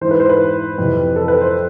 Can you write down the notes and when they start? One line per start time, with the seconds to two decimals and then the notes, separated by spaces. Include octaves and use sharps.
0.01 G#2 E3 C5
0.11 B4
0.20 C5
0.29 B4
0.78 F2 C3 E3
1.16 A4
1.28 B4
1.41 C5